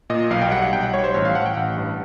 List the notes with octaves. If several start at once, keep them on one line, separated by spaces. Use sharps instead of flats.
A#2 D#5
B1 F5
G5
G3 F#5
F#5
B1 G5
F#5
G3 C#5
C5
A1 C#5
F5
A1 F#5
G5
A1 F#5
G2